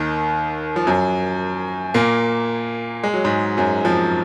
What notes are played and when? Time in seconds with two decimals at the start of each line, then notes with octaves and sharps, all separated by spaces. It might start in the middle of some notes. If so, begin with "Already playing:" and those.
Already playing: D#2 D#3
0.76 F3
0.87 F#2 F#3
1.94 A#2 A#3
3.03 G#3
3.14 F#3
3.25 G#2 G#3
3.57 F#2 F#3
3.85 F2 F3